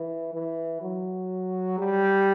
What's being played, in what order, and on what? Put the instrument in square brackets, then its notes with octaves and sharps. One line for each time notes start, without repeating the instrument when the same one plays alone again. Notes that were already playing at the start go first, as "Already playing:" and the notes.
Already playing: [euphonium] E3
E3
F#3
G3